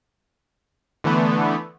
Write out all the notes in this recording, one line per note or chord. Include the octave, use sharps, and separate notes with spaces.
D3 E3 A3 B3